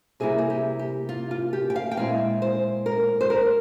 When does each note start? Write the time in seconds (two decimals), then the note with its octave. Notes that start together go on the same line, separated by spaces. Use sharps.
0.20 C3 G3 A#3 E4 G#4
0.38 G#4
0.50 G4
0.79 G4
1.09 F4
1.31 F4
1.53 G4
1.70 G5
1.76 F5
1.91 G5
1.97 A#2 G#3 C4 E4 F5
2.42 C5
2.86 A#4
3.21 C5
3.30 A#4